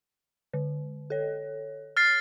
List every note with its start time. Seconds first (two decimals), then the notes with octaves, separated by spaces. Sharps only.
0.53 D3
1.10 A4 C#5
1.97 F6 A6 C7